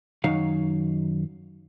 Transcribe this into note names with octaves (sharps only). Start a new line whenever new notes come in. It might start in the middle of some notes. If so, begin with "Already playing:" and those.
F#2 D#3 F#3 D#4 C#5 F5